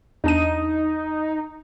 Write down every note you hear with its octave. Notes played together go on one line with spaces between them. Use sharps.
E2 D4 D#4 D#7